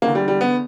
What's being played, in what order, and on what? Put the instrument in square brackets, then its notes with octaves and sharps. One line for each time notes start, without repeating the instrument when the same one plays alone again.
[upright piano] E2 A#3
D3
G3
G3
B3